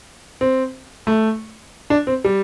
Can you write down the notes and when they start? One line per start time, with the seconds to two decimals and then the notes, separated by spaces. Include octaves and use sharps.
0.41 C4
1.07 A3
1.90 D4
2.07 C4
2.24 G3